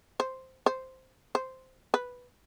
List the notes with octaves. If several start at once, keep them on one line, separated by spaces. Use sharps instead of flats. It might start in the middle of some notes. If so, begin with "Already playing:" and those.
C5
C5
C5
B4